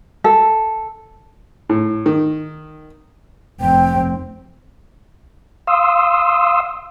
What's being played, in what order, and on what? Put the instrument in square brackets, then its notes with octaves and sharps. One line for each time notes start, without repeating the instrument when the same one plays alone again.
[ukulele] A4
[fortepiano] A2
D#3
[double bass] F1 C4 [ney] G5
[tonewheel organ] F5 C6 D#6 E6